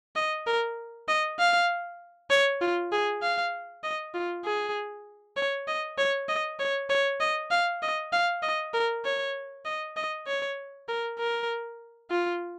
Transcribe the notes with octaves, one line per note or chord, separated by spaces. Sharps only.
D#5
A#4
D#5
F5
C#5
F4
G#4
F5
D#5
F4
G#4
C#5
D#5
C#5
D#5
C#5
C#5
D#5
F5
D#5
F5
D#5
A#4
C#5
D#5
D#5
C#5
A#4
A#4
F4